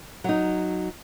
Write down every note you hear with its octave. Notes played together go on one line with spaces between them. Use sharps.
F#3 D#4